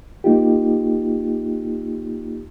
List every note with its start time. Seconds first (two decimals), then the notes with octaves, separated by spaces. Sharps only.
0.24 A#3 D#4 F4 G4